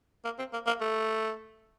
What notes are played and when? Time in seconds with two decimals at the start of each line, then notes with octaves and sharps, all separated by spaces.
0.25 A#3
0.39 C4
0.53 A#3
0.67 A#3
0.81 A3